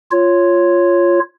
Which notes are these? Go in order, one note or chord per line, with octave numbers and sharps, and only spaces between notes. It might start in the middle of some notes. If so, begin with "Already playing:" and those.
F4 C#5